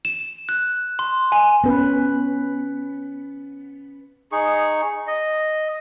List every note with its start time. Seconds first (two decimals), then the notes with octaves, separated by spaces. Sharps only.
0.05 E7
0.49 F#6
0.99 C6
1.32 G#5
1.64 B3 C#4 B4
4.32 D#4 G#4 C#6
5.07 D#5